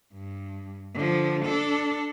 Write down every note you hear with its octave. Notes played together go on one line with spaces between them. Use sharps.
G2
D3 F3
D4 A4